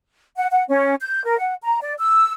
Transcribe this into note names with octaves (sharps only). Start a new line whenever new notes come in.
F#5
F#5
C#4
G6
A#4
F#5
A#5
D5
E6